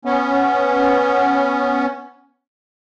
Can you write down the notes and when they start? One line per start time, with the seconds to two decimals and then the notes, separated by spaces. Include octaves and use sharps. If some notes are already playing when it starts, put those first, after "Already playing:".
0.05 B3 C#4